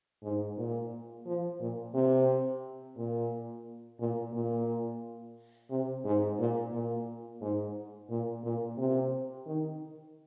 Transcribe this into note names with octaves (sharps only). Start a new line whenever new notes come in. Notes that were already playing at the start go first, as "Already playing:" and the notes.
G#2
A#2
F3
A#2
C3
A#2
A#2
A#2
C3
G#2
A#2
A#2
G#2
A#2
A#2
C3
D#3